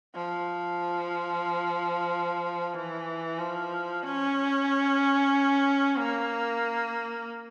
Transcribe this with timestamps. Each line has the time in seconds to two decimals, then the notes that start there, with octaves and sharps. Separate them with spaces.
0.15 F3
2.75 E3
3.39 F3
4.03 C#4
5.97 A#3